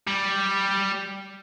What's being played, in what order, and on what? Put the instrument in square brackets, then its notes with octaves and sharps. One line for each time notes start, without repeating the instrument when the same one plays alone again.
[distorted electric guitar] G3